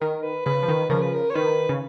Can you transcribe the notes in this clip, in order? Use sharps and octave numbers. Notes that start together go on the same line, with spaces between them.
D#3 A#4
B4
C#3 B4
F3
D#3
C#3 F3 A#4
B4
A#4
C#5
D#3 B4
C#3